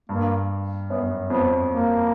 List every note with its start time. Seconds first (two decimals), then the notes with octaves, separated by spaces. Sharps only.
0.09 G2 A#3
0.89 F#2 B3
1.29 F2 B3
1.70 A#3